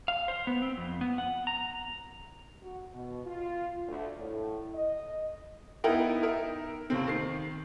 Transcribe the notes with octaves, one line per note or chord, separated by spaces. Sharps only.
F5
C5
B3
C4
F2
B3
F#5
A#5
F#4
B2
F4
D2
A2
D#5
B3 D#4 E4 A#4 G5
D#4 A#4 E5
D#2 C3 C4
D#3 C7